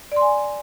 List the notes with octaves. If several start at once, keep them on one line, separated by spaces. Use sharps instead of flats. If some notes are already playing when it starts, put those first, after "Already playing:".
D5 G#5 C6